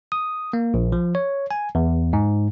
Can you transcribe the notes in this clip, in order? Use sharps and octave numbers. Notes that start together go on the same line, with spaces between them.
D#6
A#3
A#1
F3
C#5
G#5
E2
G#2